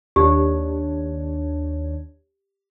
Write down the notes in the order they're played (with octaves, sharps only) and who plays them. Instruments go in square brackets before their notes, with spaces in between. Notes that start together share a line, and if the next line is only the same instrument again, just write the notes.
[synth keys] D#2 D4 C#5 [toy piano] G4